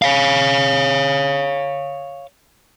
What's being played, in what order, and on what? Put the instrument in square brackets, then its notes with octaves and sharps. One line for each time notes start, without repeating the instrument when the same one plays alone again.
[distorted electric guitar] C#5 F5